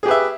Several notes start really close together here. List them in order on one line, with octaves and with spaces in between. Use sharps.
G#4 G4 B4 E5